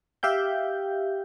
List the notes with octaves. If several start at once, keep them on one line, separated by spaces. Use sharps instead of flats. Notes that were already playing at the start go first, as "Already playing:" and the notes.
G4 E5 F5 G5 G6